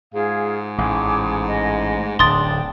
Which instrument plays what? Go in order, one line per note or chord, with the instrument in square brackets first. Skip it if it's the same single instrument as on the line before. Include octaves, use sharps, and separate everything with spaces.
[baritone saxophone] G#2 [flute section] F4 G#4 F5
[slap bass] A1 [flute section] G#5 D6 D#6
[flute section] D#5 G#5
[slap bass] D1 [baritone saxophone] D4 [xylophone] C6 D#6 A6
[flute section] G5